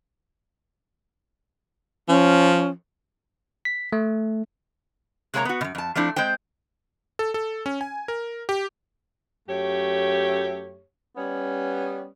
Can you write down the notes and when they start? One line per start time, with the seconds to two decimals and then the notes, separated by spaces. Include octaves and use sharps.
2.09 F3 C#4
3.65 B6
3.93 A3
5.34 C3 G#3 A#3 C5 C#5 A#5
5.45 B3 F#4
5.61 F#2 B2
5.75 F2 A5
5.95 F3 A3 C4 D4 E4
6.16 G#3 C4 C5 G5
7.19 A4
7.34 A4
7.66 C#4
7.81 G#5
8.08 A#4
8.49 G4
9.48 F#2 A3 G4 C#5
11.16 G3 B3 C#4